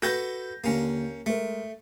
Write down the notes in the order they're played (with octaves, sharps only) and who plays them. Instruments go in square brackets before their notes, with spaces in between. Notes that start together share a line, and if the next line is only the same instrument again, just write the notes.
[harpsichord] F#4 A4 B4 [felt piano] G6 A#6
[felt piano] D#2 D3 [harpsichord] A#3 C#4
[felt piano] G#3 A#4 [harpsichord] A3